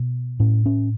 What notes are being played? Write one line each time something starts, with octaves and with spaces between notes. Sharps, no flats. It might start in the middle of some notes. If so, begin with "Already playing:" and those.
Already playing: B2
A2 C#4
C#4